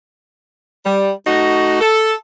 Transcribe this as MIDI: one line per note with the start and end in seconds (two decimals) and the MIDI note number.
0.85 1.11 55
1.26 1.80 57
1.26 1.80 63
1.26 1.80 66
1.81 2.12 69